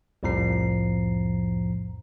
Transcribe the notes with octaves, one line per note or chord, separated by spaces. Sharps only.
C2 F2 A2 F3 A#5 C7